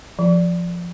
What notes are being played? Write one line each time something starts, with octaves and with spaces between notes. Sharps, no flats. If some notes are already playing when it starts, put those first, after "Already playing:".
F3